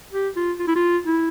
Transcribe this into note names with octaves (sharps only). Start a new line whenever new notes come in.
G4
F4
F4
E4
F4
E4